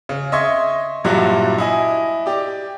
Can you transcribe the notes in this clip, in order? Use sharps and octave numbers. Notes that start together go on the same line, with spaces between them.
C#3
D#5 E5 C6 C#6 G#6
G2 A#2 F#3 G3 E4 F#4
E4 D#5 G#5
G4 D5